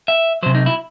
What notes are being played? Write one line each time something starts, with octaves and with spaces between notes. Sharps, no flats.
E5
C3 F#3 C5
D#4
E4